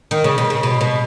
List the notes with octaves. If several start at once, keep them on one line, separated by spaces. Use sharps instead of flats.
D#3
C#3
B2
C#3
B2
B2